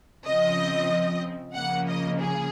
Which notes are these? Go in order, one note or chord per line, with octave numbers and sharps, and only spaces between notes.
C#3 F3 C4 D#5
C#3 F3 A#3 F#5
D#5
G#4